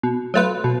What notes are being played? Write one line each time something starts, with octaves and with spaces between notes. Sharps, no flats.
B2
F#3 A3 F4 B4
B2